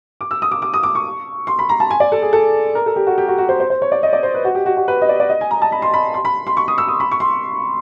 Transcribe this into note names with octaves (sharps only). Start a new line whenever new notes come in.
D6
E6
D#6
D6
D6
D#6
D6
C#6
C6
B5
A#5
A5
G#5
D5
A4
G#4
A4
A#4
A4
G4
F#4
G4
F#4
F#4
C5
C5
C5
C#5
D5
D#5
D5
C5
B4
F#4
G4
F#4
F#4
B4
D#5
D5
D5
D#5
G#5
A#5
A5
B5
C6
B5
C6
B5
C6
C#6
D#6
E6
D#6
B5
C#6
C6